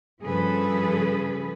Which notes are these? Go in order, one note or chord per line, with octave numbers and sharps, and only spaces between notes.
G2 C#3 F3 G#4 A4 B4